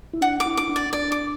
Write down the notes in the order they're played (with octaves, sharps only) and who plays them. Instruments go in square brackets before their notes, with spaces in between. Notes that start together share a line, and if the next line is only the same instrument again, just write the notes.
[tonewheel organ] E4
[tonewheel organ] D4 [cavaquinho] F#5
[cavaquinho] D6
[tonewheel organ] E4
[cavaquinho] D6
[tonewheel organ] D4
[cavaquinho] D5
[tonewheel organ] D4 [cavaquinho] D5
[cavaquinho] D6